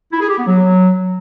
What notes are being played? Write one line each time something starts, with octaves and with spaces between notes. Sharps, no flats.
E4
G#4
G4
B3
F#3